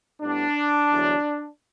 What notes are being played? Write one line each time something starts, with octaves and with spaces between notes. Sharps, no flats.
A2 G3 B3 D4
E2 D3 F#3